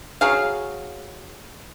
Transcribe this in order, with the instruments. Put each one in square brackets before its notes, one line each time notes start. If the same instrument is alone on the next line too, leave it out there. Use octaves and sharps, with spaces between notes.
[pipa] F#3 G#4 F5